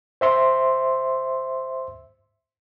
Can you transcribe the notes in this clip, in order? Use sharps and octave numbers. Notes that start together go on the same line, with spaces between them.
C5 E5 C6